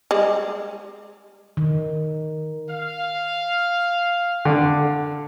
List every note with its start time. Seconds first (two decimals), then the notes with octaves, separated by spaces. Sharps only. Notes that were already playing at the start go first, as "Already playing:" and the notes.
0.11 G3 G#3
1.57 D#3
2.69 F5
4.45 D3